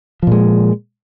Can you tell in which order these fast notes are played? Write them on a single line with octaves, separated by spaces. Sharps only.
F3 A#2 G#3